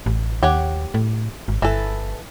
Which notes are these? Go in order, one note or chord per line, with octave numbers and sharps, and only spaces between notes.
A1
D#2 G4 C#5 F#5
A2
G#1
G1 E3 A4